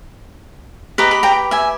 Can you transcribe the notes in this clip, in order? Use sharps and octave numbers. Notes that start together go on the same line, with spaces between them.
G4 B4 D#5 A#5
B5
G5 A#5
E5 G#5